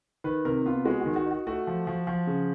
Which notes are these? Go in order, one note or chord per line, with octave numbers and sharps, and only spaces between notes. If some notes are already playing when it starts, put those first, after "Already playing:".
D#3 B4
C3 A#4
B3 F4
G#3 F#4
D#3 F#4
F#4
D#4 F#4
A3 F#4
F3
F3
F3
C#3